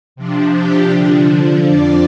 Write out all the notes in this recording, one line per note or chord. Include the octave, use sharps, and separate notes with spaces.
C3 F3 D4
G4
D3 F3 D4
F2 F3 D4 D5